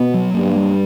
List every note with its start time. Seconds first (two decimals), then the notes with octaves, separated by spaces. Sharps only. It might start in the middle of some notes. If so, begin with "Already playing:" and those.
Already playing: B2 B3
0.14 F#3
0.34 G2 A#3
0.56 G3